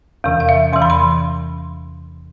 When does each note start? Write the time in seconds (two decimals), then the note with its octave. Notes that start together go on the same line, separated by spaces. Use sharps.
0.24 E2 C3 E3
0.40 F5
0.49 E5
0.72 E2 C3 E3 C6
0.82 B5
0.90 C6